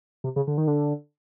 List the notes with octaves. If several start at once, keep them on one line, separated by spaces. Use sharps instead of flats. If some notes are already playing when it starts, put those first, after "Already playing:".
C3
C#3
D3
D#3
D3